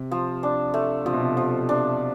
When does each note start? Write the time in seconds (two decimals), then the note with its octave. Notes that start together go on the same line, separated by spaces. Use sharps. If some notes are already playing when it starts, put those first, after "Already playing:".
Already playing: C3
0.11 F3
0.43 D4
0.74 A3
1.05 C3 F3
1.13 B2
1.20 C3
1.37 F3
1.69 D4